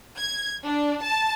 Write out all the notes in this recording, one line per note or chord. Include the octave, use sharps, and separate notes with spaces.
G#6
D4
A5